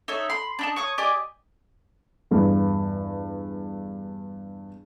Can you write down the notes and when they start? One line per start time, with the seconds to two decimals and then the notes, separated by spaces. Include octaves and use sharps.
0.08 D#4 A4 C#5 E5
0.30 B5 C6
0.59 D4 D#4 A5
0.76 C#5 C#6 D#6
0.98 G4 D5 D#5 G#5
2.31 E2 G2